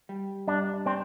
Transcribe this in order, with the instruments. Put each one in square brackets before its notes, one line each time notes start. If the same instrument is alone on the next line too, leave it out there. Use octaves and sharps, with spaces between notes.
[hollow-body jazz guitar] G3
[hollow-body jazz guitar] G2 [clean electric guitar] D4
[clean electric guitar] C4 [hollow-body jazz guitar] D4